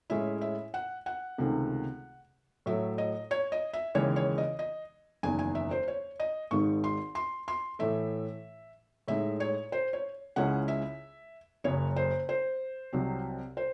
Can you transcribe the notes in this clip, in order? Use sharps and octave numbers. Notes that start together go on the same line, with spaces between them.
A2 G#3 C#4 E4 E5
E5
F#5
F#5
C#2 C3 D#3 A3 C4
A2 F#3 A3 E5
D#5
C#5
D#5
E5
D#2 C#3 E3 G#3 C#4 C#5
C#5
D#5
D#5
F#1 E2 D#3 G#5
G#5
E5
C5
C#5
D#5
G#1 G#2 D#3 G#3 C#6
C6
C6
C6
A2 E3 A3 E5
A2 G#3 D#4 E5
C#5
C5
C#5
C#2 C#3 G#3 C#4 E4 F#5
E5
F#1 F#2 C#3 C#5
C5
C5
C2 C3 F#3 C4
C5